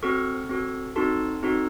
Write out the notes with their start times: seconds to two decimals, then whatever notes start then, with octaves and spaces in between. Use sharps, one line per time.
0.03 C4 F#4 A4 C#6 F6
0.49 C4 F#4 A4
0.96 C4 D#4 F#4 A4 A5 C6
1.43 C4 D#4 F#4 A4